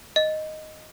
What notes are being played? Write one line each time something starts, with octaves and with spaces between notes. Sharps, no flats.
D#5